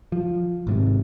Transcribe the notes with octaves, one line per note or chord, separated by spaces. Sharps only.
F3
G#1 G#2 C3